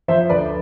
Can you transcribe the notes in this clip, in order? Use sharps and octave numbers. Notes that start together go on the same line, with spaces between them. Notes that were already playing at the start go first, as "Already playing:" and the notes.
F3 C5 E5
D2 B4 D5